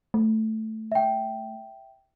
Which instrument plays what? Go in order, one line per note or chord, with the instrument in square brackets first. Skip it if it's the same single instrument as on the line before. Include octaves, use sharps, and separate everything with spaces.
[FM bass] A3
[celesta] E5 G5